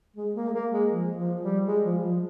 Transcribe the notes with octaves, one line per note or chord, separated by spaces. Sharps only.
G#3
A#3
G#3
A#3
G#3
F3
F3
G3
G#3
F3
F3